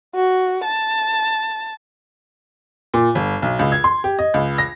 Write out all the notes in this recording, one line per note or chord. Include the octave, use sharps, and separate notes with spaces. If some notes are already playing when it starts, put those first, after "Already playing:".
F#4
A5
A#2
G1
B1
C#2
G#6
C6
G4
D#5
C#2
A#6